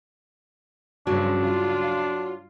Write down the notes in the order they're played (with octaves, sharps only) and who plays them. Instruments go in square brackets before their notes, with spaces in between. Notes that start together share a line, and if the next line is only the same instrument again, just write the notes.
[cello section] G2 C#3 F3 [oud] F#3 [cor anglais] D4
[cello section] F4